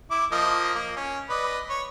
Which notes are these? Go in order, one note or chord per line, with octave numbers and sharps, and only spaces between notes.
E4 D6
F3 A#3 D#5
A#3
C#4
B4 D5 D#5
C#5